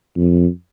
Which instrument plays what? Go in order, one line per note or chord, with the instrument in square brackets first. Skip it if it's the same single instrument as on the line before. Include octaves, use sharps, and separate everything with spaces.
[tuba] F2